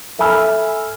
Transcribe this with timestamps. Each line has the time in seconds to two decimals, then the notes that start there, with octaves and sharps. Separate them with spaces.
0.19 A4 E5 G#5 B5 E6 F6